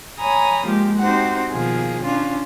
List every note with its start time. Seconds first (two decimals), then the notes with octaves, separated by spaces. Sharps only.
0.20 C#5 G#5 A#5 B5 D#6
0.66 F3 G#3 A#3 G4
0.99 C4 D#4 F#4 G4 C5 F#5
1.52 B2 D#3 F3 A#3 G#4
2.03 C#4 D4 F4